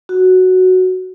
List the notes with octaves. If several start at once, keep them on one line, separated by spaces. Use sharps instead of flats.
F#4